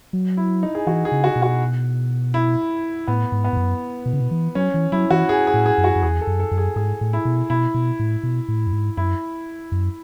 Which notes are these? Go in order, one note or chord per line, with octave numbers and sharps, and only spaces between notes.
F#3
E4
D#4
G#4
E3 F#4
G#4
C#3
F#4
B2
F#4
E4
A2 B3
G#2
B3
G#2
F#2
B2
C#3
B2
E3
F#3 C#4
E3
F#3 E4
E3 F#4
G#4
G#4
A2
G#4
F#2
F#4
F#2
E2 G#4
A4
F#2
A4
F#2
G#4
G#2 G#4
A2
E4
B2
B2 E4
B2
A2
B2
A2
F#2
G#2
F#2 E4
F#2